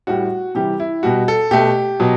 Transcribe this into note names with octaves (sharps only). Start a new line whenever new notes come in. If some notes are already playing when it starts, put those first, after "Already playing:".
A2 G3 F#4
C3 E3 G3 G4
E4
B2 G3 F#4
A4
B2 A3 G4
B2 F#3